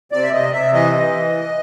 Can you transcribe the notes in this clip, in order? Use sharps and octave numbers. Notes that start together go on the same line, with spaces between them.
C3 D5
E5
C3 D#5
C3 E5
E3 D#5
E3